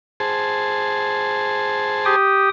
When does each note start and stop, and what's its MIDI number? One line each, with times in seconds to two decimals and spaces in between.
0.20 2.16 68
0.20 2.16 72
0.20 2.16 81
2.05 2.49 67
2.05 2.49 79
2.05 2.49 87